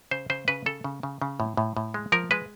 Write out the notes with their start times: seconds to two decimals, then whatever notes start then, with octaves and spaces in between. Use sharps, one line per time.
0.11 C#3 C5
0.30 C#3 C5
0.48 C#3 B4
0.66 C#3 A4
0.84 C#3
1.03 C#3
1.22 C#3
1.40 A2
1.57 A2
1.77 A2
1.94 G#3
2.12 F3 A#4
2.31 G#3 B4